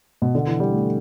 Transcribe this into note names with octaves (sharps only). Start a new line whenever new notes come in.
B2
D3
E3
G3
A3